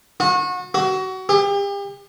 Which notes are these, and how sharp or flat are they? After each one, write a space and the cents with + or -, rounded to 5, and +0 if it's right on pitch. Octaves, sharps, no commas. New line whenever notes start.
F#4 -30
F#4 +25
G4 +35